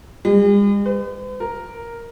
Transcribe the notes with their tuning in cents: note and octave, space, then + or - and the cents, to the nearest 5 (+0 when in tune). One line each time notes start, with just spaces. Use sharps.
G#3 -45
B4 +45
A#4 +0